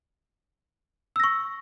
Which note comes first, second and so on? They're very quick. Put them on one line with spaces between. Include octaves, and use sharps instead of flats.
E6 A#6 C#6